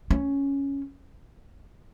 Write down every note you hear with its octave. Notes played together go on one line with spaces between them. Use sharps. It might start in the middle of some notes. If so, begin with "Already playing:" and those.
C#4